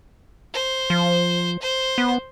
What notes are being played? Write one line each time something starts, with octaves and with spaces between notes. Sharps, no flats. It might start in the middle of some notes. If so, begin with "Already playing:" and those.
C5
F3
C5
B3